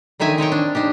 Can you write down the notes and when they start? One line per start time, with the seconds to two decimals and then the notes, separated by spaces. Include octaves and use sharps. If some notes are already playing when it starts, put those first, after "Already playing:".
0.20 D3 D#3 D#4 E5 G#5
0.38 C4 D#4 C#5 G5
0.52 D4
0.75 D4 D#4 G4